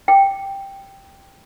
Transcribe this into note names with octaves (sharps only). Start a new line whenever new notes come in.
G5